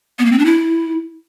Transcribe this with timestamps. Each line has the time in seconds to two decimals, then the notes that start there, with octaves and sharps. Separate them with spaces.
0.19 B3
0.25 A#3
0.32 C4
0.39 D4
0.46 E4